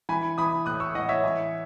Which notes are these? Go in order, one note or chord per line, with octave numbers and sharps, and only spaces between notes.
E3 G#5 B5
E3 B5 D#6
A2 D#6 F#6
C#6 E6
E3 D#5 F#5
C#5 E5
E3